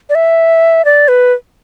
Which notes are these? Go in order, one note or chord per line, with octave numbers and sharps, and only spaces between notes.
D5
E5
D5
B4